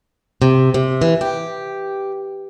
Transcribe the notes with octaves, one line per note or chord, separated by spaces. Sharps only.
C3
C3
E3
G4